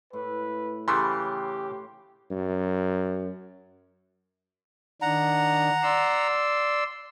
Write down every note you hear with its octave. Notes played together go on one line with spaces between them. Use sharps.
A2 B4
C#3 E3 A3 G4 B4 C#5 G5 C6
F#2
D#3 D4 F#5 A#5
D5 C6 E6